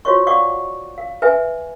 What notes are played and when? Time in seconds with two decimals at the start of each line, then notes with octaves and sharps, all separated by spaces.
0.05 F4 F#4 C5 C#5 D#5 C#6
0.27 D5 D#5 F5 F#5 C#6 D6
0.98 F5
1.22 B4 E5 G#5